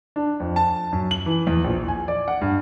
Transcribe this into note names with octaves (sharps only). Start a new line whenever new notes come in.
D4
F2
A5
F#2
F#7
E3
E2
A#1
G#5
D5
F#5
G2